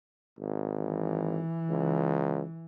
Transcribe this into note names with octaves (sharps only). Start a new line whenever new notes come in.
G#1
E3
C#2